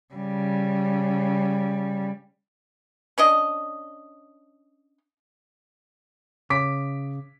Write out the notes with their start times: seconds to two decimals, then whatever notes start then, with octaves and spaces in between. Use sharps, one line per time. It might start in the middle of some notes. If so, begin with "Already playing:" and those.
0.15 C#3 G3
3.18 C#4 D4 D#5
6.50 C#3 D6 B6